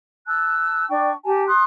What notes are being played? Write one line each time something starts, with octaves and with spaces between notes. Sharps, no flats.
A5 E6 F#6
D4 D5 G5 C#6
G4 G#5 A5
C6 D#6 F#6